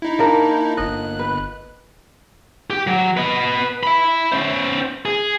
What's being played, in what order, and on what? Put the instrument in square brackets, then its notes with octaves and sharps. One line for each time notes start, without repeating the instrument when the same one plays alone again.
[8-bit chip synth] D#4 E4
[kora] A#3 D4 A#4
[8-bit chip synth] G1 F#6 [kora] D#5
[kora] B4
[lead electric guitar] G4
F#3
B4 D#5
E5 B5
C#4 C5
G#4